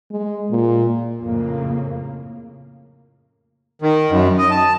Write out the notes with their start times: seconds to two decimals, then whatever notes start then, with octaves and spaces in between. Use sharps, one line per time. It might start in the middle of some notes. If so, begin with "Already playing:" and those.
0.11 G#3
0.51 A#2
1.21 F2 A2 C#3 A#3
3.82 D#3
4.10 F#2
4.38 D#5
4.51 A5